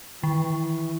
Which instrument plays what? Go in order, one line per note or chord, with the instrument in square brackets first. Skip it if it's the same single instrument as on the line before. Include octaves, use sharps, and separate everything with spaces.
[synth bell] D#3 [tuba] E3